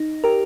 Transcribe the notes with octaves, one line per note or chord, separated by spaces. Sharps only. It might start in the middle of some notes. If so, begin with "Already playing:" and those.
Already playing: D#4
G4 A#4